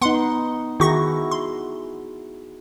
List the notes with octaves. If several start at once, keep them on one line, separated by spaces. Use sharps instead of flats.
B3 D#4 F#5 C6
D#3 E4 F#4 G#4 C#6 A#6
C6